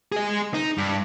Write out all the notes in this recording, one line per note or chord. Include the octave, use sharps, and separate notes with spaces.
G#4 D#5
D#4
G2